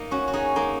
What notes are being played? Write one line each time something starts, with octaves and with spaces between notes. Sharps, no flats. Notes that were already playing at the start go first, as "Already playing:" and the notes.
Already playing: A#3 D#4
C#4 F#4
F#4
D#4 G#4
A#3 D#4